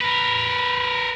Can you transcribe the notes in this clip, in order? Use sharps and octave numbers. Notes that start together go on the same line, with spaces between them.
A#4 B4